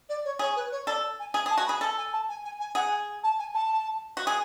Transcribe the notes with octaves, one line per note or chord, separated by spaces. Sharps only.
D5
C#5
G#4 C#5
B4
C#5
A4 D5
G#5
G#4
G#4
A5
F#4
B5
G#4
A4 A5
G#5
A5
G#5
G#5
G#5
G#4 F#5
G#5
A5
G#5
A5
F#4
G#4